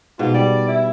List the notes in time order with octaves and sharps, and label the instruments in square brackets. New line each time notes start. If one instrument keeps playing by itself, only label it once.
[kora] G#2 B2 [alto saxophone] F4
[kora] G3 [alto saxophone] D5
[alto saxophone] E4